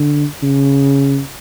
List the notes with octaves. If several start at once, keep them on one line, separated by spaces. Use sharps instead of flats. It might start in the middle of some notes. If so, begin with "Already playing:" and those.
Already playing: D3
C#3